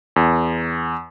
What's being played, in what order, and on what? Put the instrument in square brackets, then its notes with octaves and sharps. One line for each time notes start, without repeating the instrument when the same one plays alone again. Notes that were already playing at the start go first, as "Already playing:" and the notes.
[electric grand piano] E2